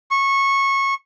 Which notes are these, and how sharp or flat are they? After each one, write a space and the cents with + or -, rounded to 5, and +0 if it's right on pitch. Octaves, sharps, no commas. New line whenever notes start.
C#6 -20